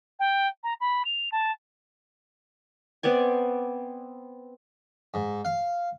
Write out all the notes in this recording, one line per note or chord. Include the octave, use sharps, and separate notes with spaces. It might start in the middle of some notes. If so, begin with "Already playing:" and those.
G5
A#5
B5
F7
A5
B3 C4 D5 G#5
G#2
F5